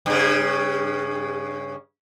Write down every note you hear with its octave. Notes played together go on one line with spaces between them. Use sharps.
G2 C#3